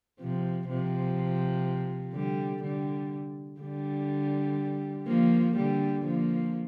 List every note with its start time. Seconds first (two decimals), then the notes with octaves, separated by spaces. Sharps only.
0.20 C3 F3
0.68 C3 F3
2.14 D3 G3
2.63 D3 G3
3.61 D3 G3
5.07 F3 A#3
5.56 D3 G3
6.05 F3 A#3